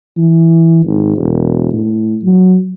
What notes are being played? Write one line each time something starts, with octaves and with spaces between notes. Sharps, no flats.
E3
G#1
E1
A2
F#3